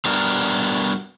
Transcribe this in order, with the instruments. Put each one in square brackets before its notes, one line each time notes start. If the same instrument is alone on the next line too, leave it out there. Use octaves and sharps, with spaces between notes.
[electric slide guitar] G3 B3 D4 F#4 A#4